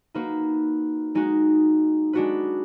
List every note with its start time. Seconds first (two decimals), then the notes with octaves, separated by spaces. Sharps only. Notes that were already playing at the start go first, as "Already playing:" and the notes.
0.14 A#3 D#4 F#4 B4
1.15 G#3 D#4 F#4
2.13 G#3 D4 F#4 B4